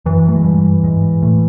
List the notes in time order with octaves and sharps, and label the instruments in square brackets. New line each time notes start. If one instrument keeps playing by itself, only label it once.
[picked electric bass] F#2 F#3 [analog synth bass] E3
[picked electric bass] A3
G#3
G2 G3
G#2 G#3
A2 A3